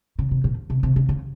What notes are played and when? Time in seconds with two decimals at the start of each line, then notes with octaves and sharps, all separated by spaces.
0.19 C#3
0.31 C3
0.44 A#2
0.70 C3
0.83 C3
0.96 C#3
1.09 C#3